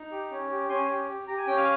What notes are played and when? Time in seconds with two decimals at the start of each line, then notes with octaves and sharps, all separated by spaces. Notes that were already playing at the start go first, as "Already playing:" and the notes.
Already playing: D#4
0.11 G4
0.31 C#4
0.50 G4
0.69 C#4 G#5 C6
0.89 G4
1.08 G4
1.28 G4 A#5
1.37 G#5
1.47 C#4 G5
1.56 F5 G#5